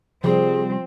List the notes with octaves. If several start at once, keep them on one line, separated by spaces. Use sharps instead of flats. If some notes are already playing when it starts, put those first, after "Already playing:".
C3 F3 G3 C4 G#4